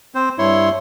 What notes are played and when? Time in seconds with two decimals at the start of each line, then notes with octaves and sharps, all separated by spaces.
0.15 C4 C5
0.38 G2 E4 C#5 C6